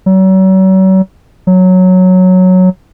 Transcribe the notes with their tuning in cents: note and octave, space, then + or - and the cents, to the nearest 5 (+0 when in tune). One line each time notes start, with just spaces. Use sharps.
F#3 +40
F#3 -5